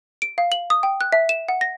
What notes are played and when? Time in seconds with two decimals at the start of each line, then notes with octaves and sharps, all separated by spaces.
0.22 D7
0.38 F5
0.52 F#7
0.70 D#6
0.83 G5
1.01 F#6
1.12 E5
1.29 E7
1.49 F#5
1.61 A#6